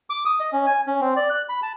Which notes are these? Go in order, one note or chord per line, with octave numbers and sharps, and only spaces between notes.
D6
D#6
D#5
C#4
G#5
C#4
C4
D5
F#6
B5
A5